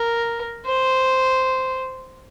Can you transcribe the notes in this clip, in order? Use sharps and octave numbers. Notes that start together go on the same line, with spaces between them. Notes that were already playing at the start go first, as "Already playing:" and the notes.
Already playing: A#4
C5